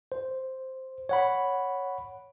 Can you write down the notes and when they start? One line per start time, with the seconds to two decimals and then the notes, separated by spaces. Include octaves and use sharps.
0.12 C5
1.09 C#5 F#5 B5